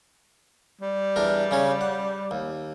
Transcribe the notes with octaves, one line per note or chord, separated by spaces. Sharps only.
G3
E2 D4 A#4
C#3 C#4 C#5
F#5
D#2